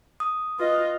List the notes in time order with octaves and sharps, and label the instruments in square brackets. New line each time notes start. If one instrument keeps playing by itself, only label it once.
[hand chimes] D#6
[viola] F4 D#5 [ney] B4